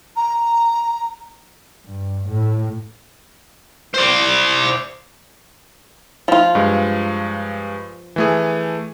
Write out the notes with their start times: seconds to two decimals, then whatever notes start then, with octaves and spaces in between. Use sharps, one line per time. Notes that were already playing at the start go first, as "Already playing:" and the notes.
0.16 A#5
1.86 G2
2.29 A2
3.94 C5 D5
6.28 F3 F4
6.55 G2 G#3
8.16 E3 A3 G#4